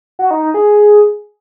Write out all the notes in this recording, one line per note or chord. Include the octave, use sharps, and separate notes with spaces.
F#4
D#4
D#4
G#4